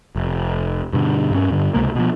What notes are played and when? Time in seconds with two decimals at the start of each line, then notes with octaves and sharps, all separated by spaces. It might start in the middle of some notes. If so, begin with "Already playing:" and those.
0.16 F1
0.93 G2 B2 D3
1.31 G2 C#4
1.51 G2 D3
1.74 C#2 C3 G#3 A#3
1.95 B2 F3